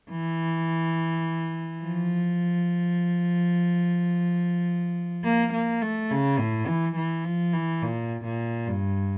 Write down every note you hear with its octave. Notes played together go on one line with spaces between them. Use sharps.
E3
F3
A#3
A#3
A3
C#3
A2
E3
E3
F3
E3
A#2
A#2
G2